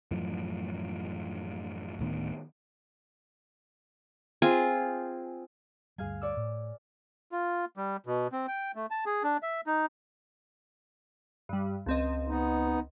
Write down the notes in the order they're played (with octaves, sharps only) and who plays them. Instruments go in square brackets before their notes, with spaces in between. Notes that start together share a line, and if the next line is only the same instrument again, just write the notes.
[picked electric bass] F#2 A2 E3 F3
D1 A2 D#3 B3
[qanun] C4 F4 G#4 G#5
[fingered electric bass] D2 G2 G3 [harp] G#4 F5 G#5
[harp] C#5 D5 E6
[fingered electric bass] A2
[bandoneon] F4
G3
B2
C4
G5
A3
A5
G#4
D4
E5
D#4
[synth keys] G2 G3
C#2 C4 D#5
[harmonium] B3 D#4